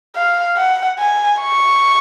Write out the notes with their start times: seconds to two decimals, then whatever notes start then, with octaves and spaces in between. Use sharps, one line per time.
0.16 F5
0.57 F#5
0.99 G#5
1.41 C#6